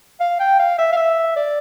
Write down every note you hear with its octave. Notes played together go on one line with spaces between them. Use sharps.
F5
G5
F5
E5
F5
E5
D5